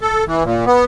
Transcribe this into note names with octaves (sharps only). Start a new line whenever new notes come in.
A4
E3
A#2
B3